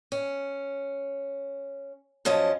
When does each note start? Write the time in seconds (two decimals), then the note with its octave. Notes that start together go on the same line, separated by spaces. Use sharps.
0.12 C#4
2.25 F#2 F3 C#4 D#5 A5